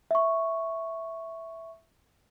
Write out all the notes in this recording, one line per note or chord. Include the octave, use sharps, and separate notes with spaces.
E5 C#6